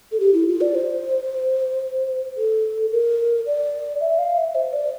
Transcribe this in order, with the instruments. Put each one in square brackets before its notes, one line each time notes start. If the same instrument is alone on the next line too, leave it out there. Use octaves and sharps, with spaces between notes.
[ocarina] A4
G4
E4
F4
D5
C5
A4
A#4
D5
E5
F5
E5
C5
D5